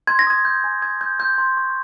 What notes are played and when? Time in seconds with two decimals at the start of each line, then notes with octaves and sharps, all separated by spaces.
0.07 C6 G#6
0.19 A#6
0.27 D#6 G#6
0.45 G6
0.64 G#5
0.82 D#6 G#6
1.01 G6
1.19 C6 G6
1.38 C6
1.57 C#6